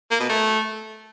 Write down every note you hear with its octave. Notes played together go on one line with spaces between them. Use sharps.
A#3
B2
A3